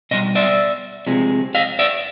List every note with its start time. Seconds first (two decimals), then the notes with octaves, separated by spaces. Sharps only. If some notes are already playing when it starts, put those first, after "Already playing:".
0.11 B2 G3 D#5
0.35 D5 E5
1.07 C3 F3 G#3
1.55 D#5 F5
1.79 D5 E5